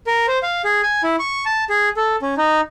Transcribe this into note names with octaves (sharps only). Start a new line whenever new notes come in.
A#4
C5
F5
G#4
G#5
E4
C#6
A5
G#4
A4
C#4
D#4